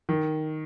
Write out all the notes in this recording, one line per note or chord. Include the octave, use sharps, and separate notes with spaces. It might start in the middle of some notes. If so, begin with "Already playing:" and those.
D#3